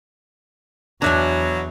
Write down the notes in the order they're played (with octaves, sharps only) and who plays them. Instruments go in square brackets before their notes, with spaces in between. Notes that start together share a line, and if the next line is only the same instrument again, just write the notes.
[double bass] E2 [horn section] B2 F#3 [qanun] D4 E5 G#5